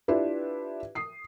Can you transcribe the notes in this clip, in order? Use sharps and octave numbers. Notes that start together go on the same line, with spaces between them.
D4 E4 F4 G4 B4
D#6 C7